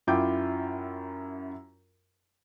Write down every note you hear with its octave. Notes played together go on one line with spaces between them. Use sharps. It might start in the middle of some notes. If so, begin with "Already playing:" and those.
F#2 E4 F4 G5 D6 G6